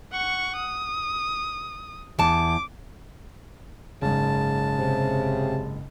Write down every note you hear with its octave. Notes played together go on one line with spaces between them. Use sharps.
F#5 C#6
D#6
E2 A5 D6
F#1 G#2 C#3 A5
C3